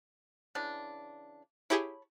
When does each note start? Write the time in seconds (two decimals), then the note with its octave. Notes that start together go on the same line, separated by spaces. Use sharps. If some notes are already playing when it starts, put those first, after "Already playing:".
0.55 C#3 E3 D4
1.70 E4 G4 G#4 C#5 A5 B5